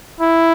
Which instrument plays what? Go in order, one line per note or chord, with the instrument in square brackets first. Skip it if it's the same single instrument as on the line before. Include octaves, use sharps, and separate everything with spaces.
[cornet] E4